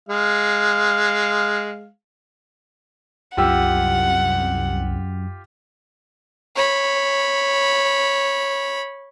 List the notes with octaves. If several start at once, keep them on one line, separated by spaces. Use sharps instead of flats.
G#3 F5
C2 F#2 F4 G4 F#5 E6
C#5 B5